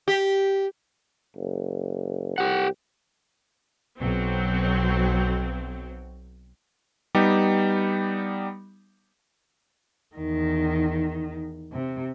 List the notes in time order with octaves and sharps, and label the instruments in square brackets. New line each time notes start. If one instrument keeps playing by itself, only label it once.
[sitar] G4
[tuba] F#1
[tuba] C2 [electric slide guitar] G4 F#5
[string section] B1 F#3 C4
[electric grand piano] G3 B3 D#4 G4
[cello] E2 D#3
C3